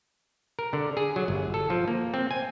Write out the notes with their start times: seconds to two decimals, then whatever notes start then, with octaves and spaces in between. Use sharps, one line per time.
0.59 A#4
0.73 D3
0.97 G#4
1.16 F#3
1.28 G1
1.54 A4
1.70 F3
1.88 A#3
2.14 C4
2.31 G#5